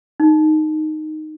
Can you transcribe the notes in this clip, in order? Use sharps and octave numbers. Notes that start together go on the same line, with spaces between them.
D#4